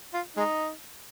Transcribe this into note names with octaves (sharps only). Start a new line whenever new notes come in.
F4
G#3 D#4